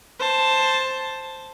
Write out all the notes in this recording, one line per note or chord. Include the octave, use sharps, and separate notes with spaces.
C5 A5